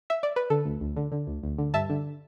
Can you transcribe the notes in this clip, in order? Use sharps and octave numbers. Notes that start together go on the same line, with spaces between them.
E5
D5
B4
D3 A4
D2
D2
D3
D3
D2
D2
D3
G2 E5 A5
D3